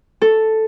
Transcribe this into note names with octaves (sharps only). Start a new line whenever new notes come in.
A4